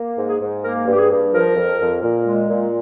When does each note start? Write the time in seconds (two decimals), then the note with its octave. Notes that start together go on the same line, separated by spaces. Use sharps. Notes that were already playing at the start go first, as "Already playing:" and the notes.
Already playing: A#3
0.17 G#2
0.28 G#4
0.40 G#2
0.63 A#3 A#4
0.86 G2
0.93 G4
0.98 G#4
1.09 G2
1.33 F3 A#4
1.56 F2
1.79 F2
2.02 A#2
2.25 G#3
2.49 A#2